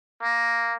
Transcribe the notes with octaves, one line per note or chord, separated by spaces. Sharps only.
A#3